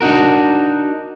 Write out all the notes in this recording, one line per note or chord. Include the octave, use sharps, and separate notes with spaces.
D4 D#4 F#4 A#4